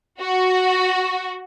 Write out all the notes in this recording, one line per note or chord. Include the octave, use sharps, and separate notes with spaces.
F#4